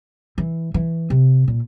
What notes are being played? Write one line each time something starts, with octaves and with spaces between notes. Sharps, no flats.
E3
E3
C3
A#2